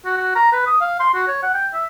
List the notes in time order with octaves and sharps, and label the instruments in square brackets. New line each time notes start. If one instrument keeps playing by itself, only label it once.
[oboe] F#4
F#4
A#5
B4
D#6
F5
C6
F#4
C#5
F#5
G5
E5